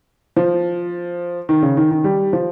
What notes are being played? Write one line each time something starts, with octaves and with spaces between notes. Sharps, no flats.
F3
D#3
C#3
D#3
D#3
G3
F3